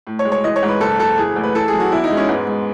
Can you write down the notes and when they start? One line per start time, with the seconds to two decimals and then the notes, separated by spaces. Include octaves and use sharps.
0.07 A2
0.19 C#5
0.25 G#3
0.32 C#5
0.44 E3 D#5
0.56 C#5
0.63 G#2
0.68 B4
0.81 F#1 A4
0.99 F#1 A4
1.18 E3 G#4
1.36 A1
1.43 B4
1.55 E3 A4
1.68 G#4
1.74 F#2
1.80 F#4
1.92 E2 E4
2.04 D#4
2.11 G#3
2.17 C#4
2.29 G#2 B3
2.47 G#3